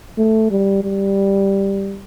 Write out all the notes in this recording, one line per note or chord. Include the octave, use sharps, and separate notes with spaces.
A3
G3
G3